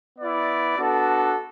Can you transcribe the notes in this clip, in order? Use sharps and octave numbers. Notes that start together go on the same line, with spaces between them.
B3 E4 D5
B3 D4 F#4 A4